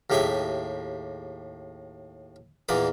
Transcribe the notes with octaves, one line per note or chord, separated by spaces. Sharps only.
D#2 A2 G4 G#4 E5 D#6
E2 A#2 E3 D5 D#6